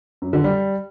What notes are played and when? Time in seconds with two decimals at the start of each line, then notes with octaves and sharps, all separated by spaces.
0.22 F#2
0.33 D3
0.44 G3